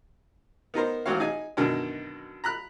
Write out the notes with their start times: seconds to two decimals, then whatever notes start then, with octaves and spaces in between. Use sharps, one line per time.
0.74 B3 D#4 A#4 C5
1.06 A1 C4 F#4 C#5 F5
1.20 D#4 G#4 G#5
1.57 F#2 B2 D3 D#3
2.44 A#5 B5 F#6